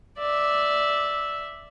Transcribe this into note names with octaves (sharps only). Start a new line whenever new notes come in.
D5 E5